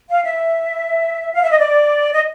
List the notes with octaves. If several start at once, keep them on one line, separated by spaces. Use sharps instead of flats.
F5
E5
F5
E5
D#5
D5
D#5